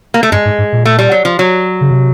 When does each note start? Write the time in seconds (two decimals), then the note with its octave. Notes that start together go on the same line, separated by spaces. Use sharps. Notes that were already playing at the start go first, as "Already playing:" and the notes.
0.14 A#3
0.23 A3
0.32 G2 G#3
0.45 G#2
0.58 G#2
0.73 A#2
0.85 A3
0.99 G3
1.12 F#3
1.25 F3
1.39 F#3
1.81 C#3
1.91 C3